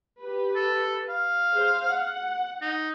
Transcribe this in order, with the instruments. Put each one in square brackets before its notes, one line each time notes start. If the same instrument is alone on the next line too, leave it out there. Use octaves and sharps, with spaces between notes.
[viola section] G4 B4
[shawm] A4
F5
[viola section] G#4 C5
F#5
[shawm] D#4